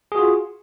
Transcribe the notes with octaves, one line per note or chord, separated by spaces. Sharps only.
F4 F#4 G#4